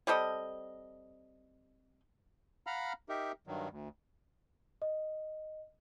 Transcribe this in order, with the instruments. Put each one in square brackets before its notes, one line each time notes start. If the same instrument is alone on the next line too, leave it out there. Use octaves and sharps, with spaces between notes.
[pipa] G3 C4 A4 D#5
[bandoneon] F5 F#5 A#5 B5 F6
D#4 G4 A#4 E5
G2 D#3 F#3
D2
[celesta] D#5